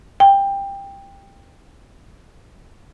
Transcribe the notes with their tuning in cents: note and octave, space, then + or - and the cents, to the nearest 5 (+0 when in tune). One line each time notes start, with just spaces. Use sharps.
G5 +15